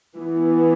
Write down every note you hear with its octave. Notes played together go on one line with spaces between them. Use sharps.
E3 B3